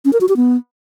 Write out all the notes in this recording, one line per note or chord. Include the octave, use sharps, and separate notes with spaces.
C#4
A#4
F#4
G4
B3